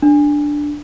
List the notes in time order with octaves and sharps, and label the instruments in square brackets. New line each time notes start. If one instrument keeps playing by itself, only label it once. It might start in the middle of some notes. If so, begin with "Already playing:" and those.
[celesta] D4